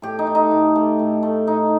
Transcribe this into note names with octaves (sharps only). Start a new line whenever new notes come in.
A2 G4
D#4
A3
D#4
A2
A3
A2
A3
A2 D#4